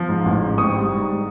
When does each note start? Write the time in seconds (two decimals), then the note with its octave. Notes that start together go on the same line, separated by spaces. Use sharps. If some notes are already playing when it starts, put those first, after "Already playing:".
Already playing: F3
0.09 G#2
0.25 A1
0.42 G#2
0.58 G#1 C#6 D#6
0.74 G3
0.91 G#2